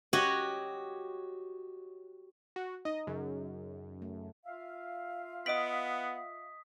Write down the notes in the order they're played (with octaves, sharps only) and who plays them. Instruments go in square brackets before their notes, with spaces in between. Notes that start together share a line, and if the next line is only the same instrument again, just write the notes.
[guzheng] F#4 G4 C#5 D#5 F#5
[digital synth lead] F#4
[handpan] D#4 [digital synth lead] D#5
[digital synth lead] F#2 [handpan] C#3 F#3
[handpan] A3
[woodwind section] F4 E5 F5
[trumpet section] B3 F#5 [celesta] D#5 D7 F#7 [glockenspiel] D#6 B6